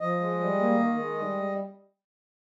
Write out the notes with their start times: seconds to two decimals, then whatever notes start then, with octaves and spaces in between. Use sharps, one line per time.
0.01 F3 D#5
0.21 G#3
0.40 G3
0.60 A#3
0.80 D#3
0.99 G#3
1.19 G3